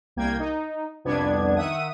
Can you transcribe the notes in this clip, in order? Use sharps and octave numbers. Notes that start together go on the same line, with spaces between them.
C2 A#3 G5 G#6
D#4
C2 F2 B3 D4 G#6
D#3 E5 F#5 D#6 D#7